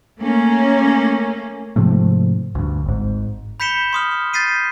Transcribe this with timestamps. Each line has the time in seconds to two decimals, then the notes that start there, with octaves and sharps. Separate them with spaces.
0.20 A3 A#3 C#4
1.76 G#2 C3 F3 A3
2.55 D2 G2
2.86 G#1 G#2
3.60 B5 G6 B6 C#7 E7 G7
3.93 C6 D#6 F6
4.33 G6 A6 B6 C7 D#7